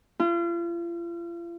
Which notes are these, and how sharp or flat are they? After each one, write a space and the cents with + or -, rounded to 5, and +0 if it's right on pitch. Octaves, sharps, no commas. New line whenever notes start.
F4 -40